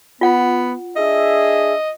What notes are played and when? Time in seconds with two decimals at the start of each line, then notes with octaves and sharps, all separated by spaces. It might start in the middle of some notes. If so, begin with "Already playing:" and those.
0.21 B3 F4 F#5
0.96 D4 G#4 D#5 E5